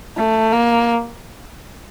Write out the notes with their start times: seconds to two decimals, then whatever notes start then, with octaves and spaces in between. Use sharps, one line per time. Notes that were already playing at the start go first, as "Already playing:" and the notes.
0.17 A3
0.52 A#3